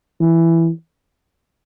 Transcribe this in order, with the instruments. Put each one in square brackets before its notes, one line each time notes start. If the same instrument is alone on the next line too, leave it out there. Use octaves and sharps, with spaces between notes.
[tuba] E3